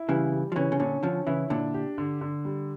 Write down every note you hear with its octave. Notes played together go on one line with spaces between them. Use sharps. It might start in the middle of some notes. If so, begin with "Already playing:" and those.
Already playing: E4
C#3 E3 G3
G3
F3
C#3 E3 C#4
C#3
A#2 D3 C#4
D3 F3 C#4
C#3 E3 E4
A#2 D3 D4
G4
D3
D3
G3